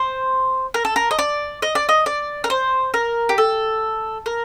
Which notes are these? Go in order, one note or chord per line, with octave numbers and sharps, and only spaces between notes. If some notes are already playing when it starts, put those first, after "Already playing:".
Already playing: C5
A#4
A4
A#4
D#5
D5
D#5
D5
D#5
D5
A#4
C5
A#4
G4
A4
A#4